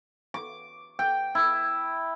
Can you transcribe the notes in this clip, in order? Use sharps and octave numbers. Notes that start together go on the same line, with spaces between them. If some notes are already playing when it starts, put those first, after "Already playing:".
D6
G5
E4